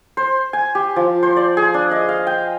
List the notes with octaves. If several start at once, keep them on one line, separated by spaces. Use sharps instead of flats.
C5
G#5
G4
F3
C5
D5
G#4
D4
D#5
F5
G5